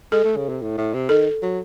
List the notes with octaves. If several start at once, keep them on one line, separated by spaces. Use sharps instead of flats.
G#3 A4
A3
C#3
C3
A2
A2
C3
D#3 A4
F#3